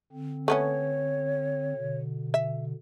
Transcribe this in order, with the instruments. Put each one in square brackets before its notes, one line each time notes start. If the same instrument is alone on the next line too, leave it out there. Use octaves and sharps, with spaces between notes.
[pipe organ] D3 C4
[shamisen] A3 B3 C#4 [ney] C#5
[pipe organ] B2 D3
[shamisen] E5